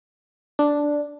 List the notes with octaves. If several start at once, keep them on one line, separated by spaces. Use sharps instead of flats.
D4